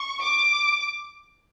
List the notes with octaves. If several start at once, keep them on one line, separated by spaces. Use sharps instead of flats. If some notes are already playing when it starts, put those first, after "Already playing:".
Already playing: C#6
D6